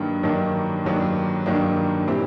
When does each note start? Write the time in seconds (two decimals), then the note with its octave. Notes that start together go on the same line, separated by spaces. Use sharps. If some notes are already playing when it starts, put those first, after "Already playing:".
Already playing: G2 D#3 F#3 A#3 D4
0.23 G2 D#3 F#3 A#3 D4
0.84 G2 D#3 F#3 A#3 D4
1.46 G2 D#3 F#3 A#3 D4
2.07 A#2 G3 C4 E4 G4